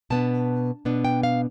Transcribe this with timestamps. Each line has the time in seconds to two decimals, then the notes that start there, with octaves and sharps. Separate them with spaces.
0.10 B2 B3 D4 A5
0.85 B2 B3 D4
1.05 G5
1.23 F5